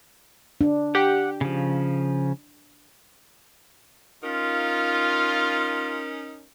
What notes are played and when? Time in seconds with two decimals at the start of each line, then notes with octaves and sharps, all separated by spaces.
0.61 D4
0.95 G4 F#5
1.41 C#3 F3
4.24 C#4 D#4 F4 A#4